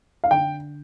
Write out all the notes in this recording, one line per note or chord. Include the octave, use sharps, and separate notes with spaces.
F5
D3 G5